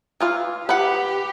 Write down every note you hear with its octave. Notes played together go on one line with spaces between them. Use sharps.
E3 F4 F5
G4 B4 F#5